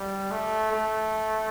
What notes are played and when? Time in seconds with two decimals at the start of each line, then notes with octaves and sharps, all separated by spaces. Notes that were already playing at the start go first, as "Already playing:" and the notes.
Already playing: G3
0.31 A3
0.72 A3